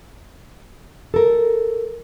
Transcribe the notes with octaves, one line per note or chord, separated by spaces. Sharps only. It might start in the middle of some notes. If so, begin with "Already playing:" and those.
A4 A#4